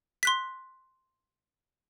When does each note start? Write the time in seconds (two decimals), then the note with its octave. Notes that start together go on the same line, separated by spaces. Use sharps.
0.23 C6 F#6 B6